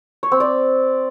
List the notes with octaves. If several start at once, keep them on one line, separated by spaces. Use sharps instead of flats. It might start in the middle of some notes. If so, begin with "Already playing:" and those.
C#5
C4
D5